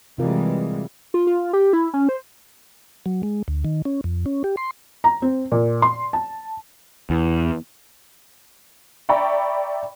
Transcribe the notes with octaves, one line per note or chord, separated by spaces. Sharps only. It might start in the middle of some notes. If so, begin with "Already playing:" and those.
C3 E3 G3 G#3 F4 A#4
F4
F4
G4
E4
C#4
C5
F#3
G#3
D2
D#3
C#4
F2
C#4
G4
C6
A#5
C4
A#2
C6
A5
E2
D5 E5 G5 A#5 B5 C#6